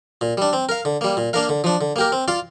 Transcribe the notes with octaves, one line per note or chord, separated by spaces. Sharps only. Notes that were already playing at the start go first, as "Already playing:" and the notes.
A#2
G3 D4
C4
A#4 F5
D3
G3 A#3
A#2
A#3 D4 A#4 F5
D3
F3 D4
D3
A#3 G4 A#4
C4
F4 D5 F5